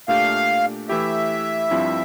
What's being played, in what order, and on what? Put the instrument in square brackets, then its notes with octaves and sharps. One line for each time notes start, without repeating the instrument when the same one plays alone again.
[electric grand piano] A#2 A3 D4 G4 [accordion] F5
[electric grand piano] E3 A3 E4 G4 [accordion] E5
[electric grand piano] G2 F3 C4 E4